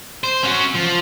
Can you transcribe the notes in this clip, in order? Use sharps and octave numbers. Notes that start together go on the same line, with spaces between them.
C5
C#4 F#4
F3